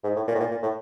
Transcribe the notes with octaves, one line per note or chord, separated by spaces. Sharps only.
G#2
A2
A#2
A2
A#2
A#2
A2